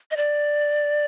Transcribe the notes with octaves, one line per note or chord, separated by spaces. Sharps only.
D#5
D5